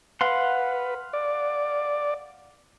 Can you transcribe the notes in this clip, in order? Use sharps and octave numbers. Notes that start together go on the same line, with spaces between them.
B4 F5 F#5 C6
D5